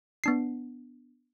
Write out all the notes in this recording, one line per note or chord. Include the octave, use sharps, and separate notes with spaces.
B3 D4 C7